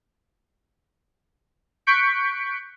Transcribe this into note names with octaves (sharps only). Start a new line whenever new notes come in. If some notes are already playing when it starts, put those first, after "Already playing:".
C#6 F#6 G6 B6 C#7 D7